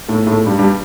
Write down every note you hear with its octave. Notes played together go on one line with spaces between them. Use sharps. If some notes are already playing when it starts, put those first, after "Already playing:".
A2 A3
A2 A3
G2 G3
G2 G3